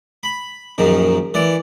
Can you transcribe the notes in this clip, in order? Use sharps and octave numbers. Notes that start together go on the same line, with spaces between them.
B5
A#1 F#2 D#3
E3 D5